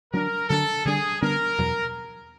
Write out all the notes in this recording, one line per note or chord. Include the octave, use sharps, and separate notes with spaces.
D3 F#3 B3 D4 A#4
D3 F#3 B3 D4 A4
D3 G3 B3 D4 G#4
D3 G3 B3 D4 A#4
E2 B2 F#3